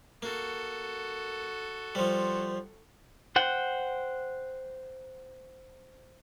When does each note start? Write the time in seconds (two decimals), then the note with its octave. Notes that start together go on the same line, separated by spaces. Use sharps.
0.22 A#3 F#4 A4
1.95 F3 G3 C5
3.36 C5 F#5 G5